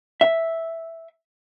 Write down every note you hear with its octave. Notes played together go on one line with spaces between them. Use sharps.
E5